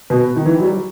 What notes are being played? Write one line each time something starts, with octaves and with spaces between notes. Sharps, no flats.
B2
D#3
E3
F#3
G3